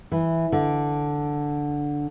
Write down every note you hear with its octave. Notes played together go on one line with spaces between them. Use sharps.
E3
D3